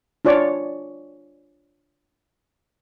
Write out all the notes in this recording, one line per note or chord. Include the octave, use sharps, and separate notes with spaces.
D4 F4 C#5 D5